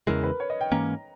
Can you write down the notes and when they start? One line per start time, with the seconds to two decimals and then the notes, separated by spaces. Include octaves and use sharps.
0.07 E2 C#3 E3 G#3 A#4
0.23 B4
0.40 C#5
0.50 D#5
0.61 G5
0.72 G#2 E3 A#3 C#4 A#5